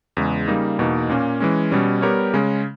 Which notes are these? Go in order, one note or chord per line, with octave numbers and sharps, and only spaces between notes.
E2 C#3 G#3
C#3 G3 A#3 D#4
E2 B2 A#3 D#4
A#2 A#3 C#4
E3 G#3 C#4
B2 G3 C#4
G3 B3 G4 A#4 C#5
C#3 G#3 C#4